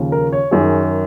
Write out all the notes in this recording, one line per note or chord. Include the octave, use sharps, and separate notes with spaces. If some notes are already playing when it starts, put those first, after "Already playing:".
Already playing: D#2 C#3 F3
A#4
C#5
F#2 D#3 G#4